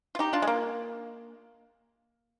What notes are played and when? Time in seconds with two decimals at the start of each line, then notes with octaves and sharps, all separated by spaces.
0.15 F4
0.19 D#4 G4
0.33 D4 F4
0.42 G#3
0.47 A#3